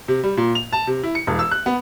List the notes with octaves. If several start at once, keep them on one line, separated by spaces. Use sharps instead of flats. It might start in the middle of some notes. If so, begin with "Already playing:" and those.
C3
G3
A#2
F7
A5
C3
E4
C#7
E1
E6
F#6
B3